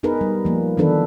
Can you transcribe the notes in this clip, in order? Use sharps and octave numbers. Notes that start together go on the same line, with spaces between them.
B3 D#4 G#4 A#4 B4
G3
F3 A#3
D#3 E3 B3 D4 A4 B4